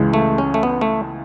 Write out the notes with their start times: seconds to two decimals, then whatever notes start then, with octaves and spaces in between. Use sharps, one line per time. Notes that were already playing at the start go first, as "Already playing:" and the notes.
Already playing: C#2 C#3 E3 G#3
0.14 A3
0.38 C#4
0.54 A3
0.63 B3
0.81 A3